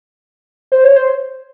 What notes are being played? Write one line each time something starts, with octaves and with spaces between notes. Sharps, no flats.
C5
C#5
C5